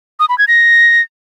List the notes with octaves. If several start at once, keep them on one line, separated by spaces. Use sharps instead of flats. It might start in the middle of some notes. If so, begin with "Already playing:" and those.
D#6
B5
G#6
A#6